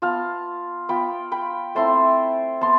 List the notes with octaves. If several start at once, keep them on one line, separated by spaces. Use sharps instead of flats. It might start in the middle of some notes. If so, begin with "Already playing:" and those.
B3 F4 F5 A5
B3 F4 G5 B5
G5 B5
A3 C4 E4 A5 C6
B3 A5 C6